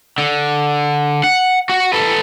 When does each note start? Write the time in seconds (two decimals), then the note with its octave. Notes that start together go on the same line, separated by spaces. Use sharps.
0.18 D3
1.24 F#5
1.69 F#4
1.93 A4 B4